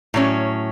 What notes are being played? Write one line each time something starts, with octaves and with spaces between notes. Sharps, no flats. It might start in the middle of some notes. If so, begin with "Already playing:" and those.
A2 F#3 C#4